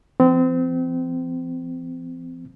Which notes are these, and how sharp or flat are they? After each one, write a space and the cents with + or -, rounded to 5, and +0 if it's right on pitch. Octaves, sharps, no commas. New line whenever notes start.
F3 -45 C4 -30